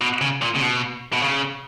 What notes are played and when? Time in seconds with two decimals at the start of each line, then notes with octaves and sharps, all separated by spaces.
0.01 B2
0.21 C#3
0.42 A#2
0.56 C#3
0.62 B2
1.13 B2
1.22 C#3